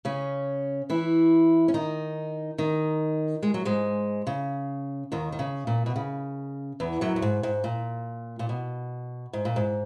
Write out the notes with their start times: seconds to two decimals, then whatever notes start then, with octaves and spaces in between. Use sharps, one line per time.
0.05 C#3 C#4
0.90 E3 E4
1.68 C#4
1.74 D#3 D#4
2.58 D#3 D#4
3.43 G#3
3.54 F#3
3.65 G#2 G#3
4.27 C#3
5.12 D#2 D#3
5.32 D#3
5.39 C#3
5.67 A#2
5.86 B2
5.96 C#3
6.80 E2 E3
7.01 F#2 F#3
7.16 F#2
7.22 G#2
7.43 G#2
7.64 A#2
8.39 A#2
8.49 B2
9.33 G#2
9.45 A#2
9.56 G#2